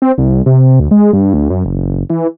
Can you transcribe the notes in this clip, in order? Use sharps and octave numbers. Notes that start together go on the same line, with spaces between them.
C4
C2
C3
D2
G#3
G2
D2
F#2
F#1
E3